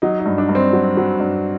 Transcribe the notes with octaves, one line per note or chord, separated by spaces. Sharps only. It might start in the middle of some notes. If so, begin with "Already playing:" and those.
F#3 D#4
D#4
G2
D4
G2
C4
F#3
F#3
G2